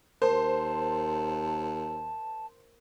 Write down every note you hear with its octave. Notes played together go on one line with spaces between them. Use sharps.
D#2 A#4 C5 A5